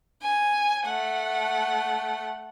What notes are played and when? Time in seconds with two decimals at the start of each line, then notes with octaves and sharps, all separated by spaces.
0.22 G#5
0.86 A3 F#5